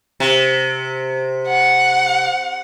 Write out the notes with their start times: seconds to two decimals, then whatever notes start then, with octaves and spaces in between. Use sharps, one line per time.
0.20 C3
1.48 F#5